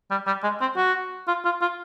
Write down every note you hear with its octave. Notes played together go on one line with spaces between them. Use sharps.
G3
G3
G#3
C4
F#4
F4
F4
F4